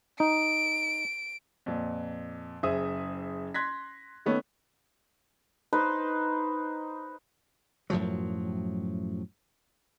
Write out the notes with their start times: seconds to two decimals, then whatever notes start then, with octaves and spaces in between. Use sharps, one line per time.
0.20 D#4 D7
1.66 F2 A#2
2.63 F#1 G#4 C5 E5 D#6
3.54 C6 F#6 G#6 A#6 B6
4.26 D#3 A3 B3 C#4
5.73 D#4 B4 C5
7.90 F#2 A2 F3 F#3